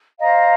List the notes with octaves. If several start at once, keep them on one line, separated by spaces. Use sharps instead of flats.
C5 D#5 F5 A#5